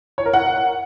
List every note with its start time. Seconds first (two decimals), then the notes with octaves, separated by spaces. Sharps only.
0.18 C#5
0.26 A#4
0.33 F#5